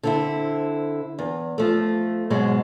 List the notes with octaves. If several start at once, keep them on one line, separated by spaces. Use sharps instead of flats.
D3 C4 E4
E2
F3 A3
G#2 B2 F#3 G#3